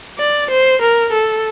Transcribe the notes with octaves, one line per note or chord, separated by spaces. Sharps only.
D5
C5
A#4
A4